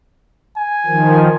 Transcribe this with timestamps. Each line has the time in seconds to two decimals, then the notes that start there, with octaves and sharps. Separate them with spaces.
0.56 G#5
0.86 D#3 F3